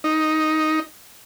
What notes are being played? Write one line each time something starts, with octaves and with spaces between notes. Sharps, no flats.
D#4